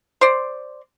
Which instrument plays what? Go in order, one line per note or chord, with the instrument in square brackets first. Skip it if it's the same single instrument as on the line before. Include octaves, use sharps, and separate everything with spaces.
[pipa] C5 D5